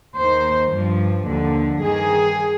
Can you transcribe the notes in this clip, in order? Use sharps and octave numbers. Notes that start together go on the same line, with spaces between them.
D#2 D#3 C5
G2 F3
D#2 D3 F3
G2 D#3 G#4